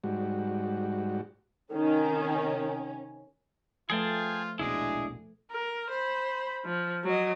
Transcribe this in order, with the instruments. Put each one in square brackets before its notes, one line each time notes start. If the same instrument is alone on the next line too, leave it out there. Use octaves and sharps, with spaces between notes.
[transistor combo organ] G#2 G3 F#4
[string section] C3 C#4 [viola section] D#3
[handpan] F3 A3 B4 [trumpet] F4 [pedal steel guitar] G#4 G5 A5
[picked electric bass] D#1 A#1 B2 [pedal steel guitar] G#3 D4 E4 [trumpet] G#4
[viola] A#4
C5 B5
F3
F#3 D#5